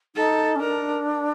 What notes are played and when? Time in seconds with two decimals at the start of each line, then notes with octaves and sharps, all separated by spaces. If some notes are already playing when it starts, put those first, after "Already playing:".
0.16 D#4 A4
0.56 C#4
0.60 D4 A#4